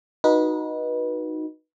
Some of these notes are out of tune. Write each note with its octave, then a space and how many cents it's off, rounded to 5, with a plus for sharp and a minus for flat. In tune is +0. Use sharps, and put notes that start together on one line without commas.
D#4 +0 F#4 -10 B4 -25